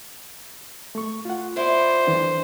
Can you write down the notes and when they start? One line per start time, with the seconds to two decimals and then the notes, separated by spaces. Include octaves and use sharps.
0.95 A3 C#6
1.25 F4 F#5
1.57 E4 C5 D5
2.07 F2 E3 D4